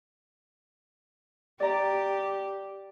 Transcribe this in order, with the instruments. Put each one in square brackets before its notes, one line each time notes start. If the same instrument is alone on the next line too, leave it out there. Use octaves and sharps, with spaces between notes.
[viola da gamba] G4 [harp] D5 A#5